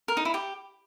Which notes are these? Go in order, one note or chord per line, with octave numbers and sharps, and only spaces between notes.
A#4
D#4
E4
G4